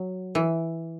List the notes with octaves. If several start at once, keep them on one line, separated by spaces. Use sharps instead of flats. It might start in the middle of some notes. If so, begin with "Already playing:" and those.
Already playing: F#3
E3